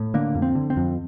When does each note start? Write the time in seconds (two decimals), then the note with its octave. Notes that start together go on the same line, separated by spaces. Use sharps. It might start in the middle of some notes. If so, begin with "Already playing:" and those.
Already playing: A2
0.14 D3 A#3
0.35 F2
0.42 C4
0.55 D3
0.70 C4
0.77 F2